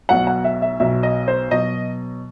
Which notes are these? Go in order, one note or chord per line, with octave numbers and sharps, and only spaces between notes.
B1 B2 F#3 F#5
F#5
E5
E5
B1 B2 F#3 E5
D#5
C5
B2 F#3 D#5